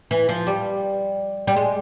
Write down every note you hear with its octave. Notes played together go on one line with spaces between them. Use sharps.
E3
F3
G3
G3
G#3